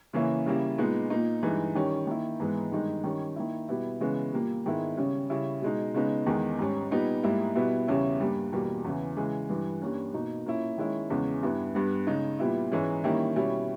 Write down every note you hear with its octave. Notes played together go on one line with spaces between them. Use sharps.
C#3 E3 A#3 C#4 E4
C#3 G3 A#3 E4
A#2 G#3 B3 D#4
A#2 A#3 D#4
G2 E3 G#3 D#4
D#3 G3 C#4
D#3 A#3 E4
G#2 E3 G#3 B3
G2 D#3 G#3 D#4
D#3 G3 C#4
D#3 A#3 E4
B2 G3 B3 E4
C#3 E3 G#3 B3
A#2 G3 A#3
G#2 D#3 G#3 B3 E4
C#3 G3 C#4
C#3 G3 C#4 E4
B2 G#3 D#4
C#3 G#3 B3 D#4
E2 D#3 G#3 D#4
G#2 G3 C#4
A#2 G3 B3 D#4
G#2 G3 A#3 E4
B2 G3 B3 E4
E2 C#3 G3 C#4 E4
G2 G3 A#3
E2 B2 G3 A#3
E2 C#3 E3
C#3 E3 G#3
G2 E3 G3
G2 G3 A#3 C#4
B2 A#3 D#4
A#2 A#3 C#4 E4
D#3 G#3 C#4 E4
E2 C#3 G#3 C#4
G2 G3 B3 E4
G2 G3 B3
C#3 G#3 D#4
A#2 G3 B3 E4
G#2 E3 G#3 C#4
D#3 G3 A#3 C#4 E4
B2 G3 C#4 E4